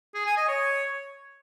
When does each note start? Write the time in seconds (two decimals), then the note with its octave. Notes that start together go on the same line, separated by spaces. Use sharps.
0.14 G#4
0.26 G#5
0.37 D#5
0.48 C#5